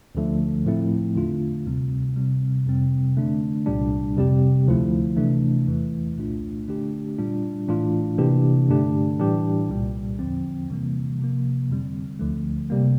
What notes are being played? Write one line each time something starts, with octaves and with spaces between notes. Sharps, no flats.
D2 D3 F3 A3
A2 F3 A3 C4 E4
E2 D3 A3 D4 F4
D2 C3 G3 C4
C3 G3 C4
F2 C3 G3 C4
D3 A3 D4
C2 A#2 G3 D4
F2 C3 G3 C4 G4
D2 D3 F3 A3 E4
C3 E3 A3 D4
E2 E3 A3
C2 A#2 A3 D4 F4
D3 A3 D4 G4
A#2 G3 D4 F4
A2 E3 A3 D4 F4
C3 E3 A#3 D4 G4
G2 D3 A3 D4 G4
A2 E3 G3 D4 G4
C2 A#2 G3
E2 D3 F3 C4
C3 E3 G3 A#3
C3 F3 A#3
F2 D3 G3 C4
D2 D3 F3 A3
C3 G3 A#3